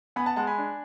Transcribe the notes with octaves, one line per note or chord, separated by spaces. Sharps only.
B3 G#5 B5
F#5 A5
G#3 F#5 A5
G#5 B5
D4